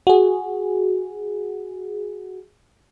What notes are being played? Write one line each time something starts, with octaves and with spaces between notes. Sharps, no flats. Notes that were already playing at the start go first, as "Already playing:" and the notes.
F#4 G#4